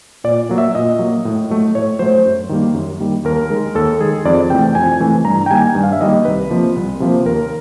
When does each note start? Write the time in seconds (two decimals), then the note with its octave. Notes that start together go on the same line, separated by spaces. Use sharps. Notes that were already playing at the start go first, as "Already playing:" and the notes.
0.24 A#2 D5
0.49 F#3 A#3
0.58 E5
0.75 A#2 D#5
0.99 F#3 A#3
1.25 A2
1.50 F#3 A3
1.75 A2 C#5
1.99 F#3 A3 C5
2.25 F#2
2.49 D#3 G3 A#3
2.74 F#2
3.00 D#3 G3 A#3
3.24 D#2 A#4
3.50 D#3 G#3
3.75 D#2 A4
4.00 D#3 G#3 G#4
4.25 F2 D5
4.50 C3 E3 A3 G5
4.75 F2 G#5
5.00 C3 E3 A3
5.25 G2 A#5
5.46 G5
5.50 D#3 G3 A#3 G#5
5.75 G2
5.83 F5
5.92 E5
6.01 D#3 G3 A#3 D#5
6.25 C2 B4
6.51 C3 F3 A#3
6.76 C2
7.00 C3 F3 A#3
7.25 D#2 A#4